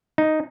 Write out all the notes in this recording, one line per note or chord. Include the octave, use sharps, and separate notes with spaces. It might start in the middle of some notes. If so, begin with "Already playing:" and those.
D#4